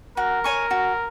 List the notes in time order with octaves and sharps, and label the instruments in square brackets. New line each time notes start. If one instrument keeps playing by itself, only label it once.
[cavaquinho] F#4 [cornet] A#4
[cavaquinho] C#5 G#5 C#6
F#4